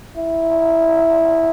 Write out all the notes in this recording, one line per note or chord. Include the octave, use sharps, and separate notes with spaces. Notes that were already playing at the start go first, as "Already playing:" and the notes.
E4